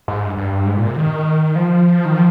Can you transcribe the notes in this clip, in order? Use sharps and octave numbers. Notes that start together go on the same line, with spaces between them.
G#2
G2
G2
G#2
A#2
C3
D#3
F3
D#3
F3